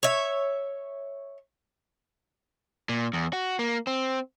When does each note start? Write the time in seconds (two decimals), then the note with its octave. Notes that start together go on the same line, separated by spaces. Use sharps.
0.03 C#5 E5
2.89 A#2
3.13 E2
3.33 F#4
3.59 A#3
3.87 C4